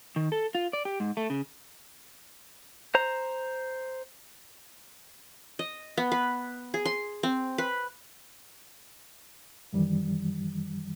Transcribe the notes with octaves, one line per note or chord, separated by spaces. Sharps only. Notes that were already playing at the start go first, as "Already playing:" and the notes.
D#3
A4
F4
D5
G4
G#2
A3
C#3
C5 A#5
D#5
B3
B4
G#4
C6
C4
B4
F#2 D#3 E3 G3